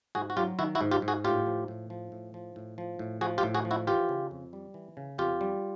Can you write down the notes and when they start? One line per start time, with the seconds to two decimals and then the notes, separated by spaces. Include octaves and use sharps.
0.15 G#2 F#4 G#4
0.30 F#4
0.36 F#3 F4 G4
0.59 D#3 E4 F#4
0.75 E4 F#4
0.81 G#2
0.91 F4 G4
1.02 G#2
1.08 F#4 G#4
1.24 A2 F4 G4
1.46 F3
1.68 A2
1.90 F3
2.12 A2
2.34 F3
2.56 A2
2.78 F3
2.99 A2
3.21 F3 F#4 G#4
3.38 F4 G4
3.43 A2
3.54 F#4 G#4
3.65 F3
3.71 E4 F#4
3.87 E3 F4 G4
4.09 C#3
4.31 F2
4.53 G3
4.74 E3
4.97 C#3
5.18 F2 F4 G4
5.41 G3